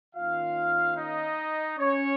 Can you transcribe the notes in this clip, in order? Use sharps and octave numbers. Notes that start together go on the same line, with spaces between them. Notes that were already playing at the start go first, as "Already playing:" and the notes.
D#3 A#3 C#4 F4 F5
D#4 D#5
C#4 C#5